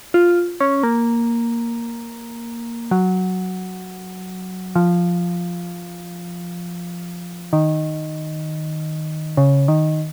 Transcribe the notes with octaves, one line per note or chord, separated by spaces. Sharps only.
F4
C#4
A#3
F#3
F3
D#3
C#3
D#3